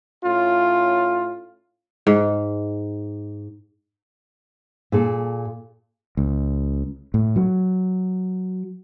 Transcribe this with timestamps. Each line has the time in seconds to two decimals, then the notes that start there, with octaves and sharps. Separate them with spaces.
0.23 A2 C#4 F4
2.07 G#2
4.92 A#2 G#4 A4
6.17 C#2
7.14 A2
7.36 F#3